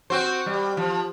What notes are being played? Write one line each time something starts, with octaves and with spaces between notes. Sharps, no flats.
C4 F#4 C5
G3
F3